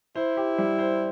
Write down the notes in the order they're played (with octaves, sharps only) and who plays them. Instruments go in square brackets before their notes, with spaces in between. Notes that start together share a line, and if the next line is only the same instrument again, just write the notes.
[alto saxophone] E4 [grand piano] C5
[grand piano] G4
G3
C5